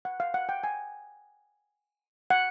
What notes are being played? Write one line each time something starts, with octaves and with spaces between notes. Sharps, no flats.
F#5
F5
F#5
G5
G#5
F#5